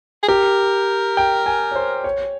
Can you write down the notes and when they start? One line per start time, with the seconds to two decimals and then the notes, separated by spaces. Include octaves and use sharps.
0.23 G#4
0.28 G4 A#4
1.17 G5
1.46 G#5
1.71 C#5
1.75 C5
2.04 C#5